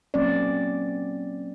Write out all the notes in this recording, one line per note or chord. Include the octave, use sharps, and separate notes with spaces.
F#3 A#3 C4 C#4 D5